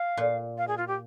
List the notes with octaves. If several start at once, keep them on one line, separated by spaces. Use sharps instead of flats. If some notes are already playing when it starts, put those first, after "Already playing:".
Already playing: F5
A#2
F5
G#4
F4
G4